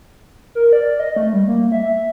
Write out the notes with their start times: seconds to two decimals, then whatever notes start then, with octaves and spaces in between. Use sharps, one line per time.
0.55 A#4
0.73 D5
1.00 D#5
1.16 A3
1.33 G3
1.48 A#3
1.72 E5